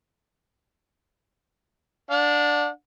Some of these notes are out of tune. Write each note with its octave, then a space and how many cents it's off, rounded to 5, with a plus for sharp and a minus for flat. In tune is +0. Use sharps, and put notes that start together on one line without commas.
D4 +0 F#5 -40